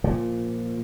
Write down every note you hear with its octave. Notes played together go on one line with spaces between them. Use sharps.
A#2 F3